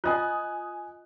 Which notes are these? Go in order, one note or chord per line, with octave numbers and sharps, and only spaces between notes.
F4 D#5 G#5 D#6 F#6